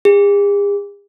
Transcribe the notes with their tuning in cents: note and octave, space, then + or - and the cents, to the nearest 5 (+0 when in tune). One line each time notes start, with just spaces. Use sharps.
G#4 -45